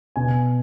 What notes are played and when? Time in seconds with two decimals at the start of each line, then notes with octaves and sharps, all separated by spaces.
0.16 B2 G#5